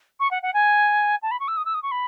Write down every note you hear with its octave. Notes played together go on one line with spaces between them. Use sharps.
C#6
F#5
F#5
G#5
A5
B5
C#6
E6
D#6
E6
D#6
C#6
B5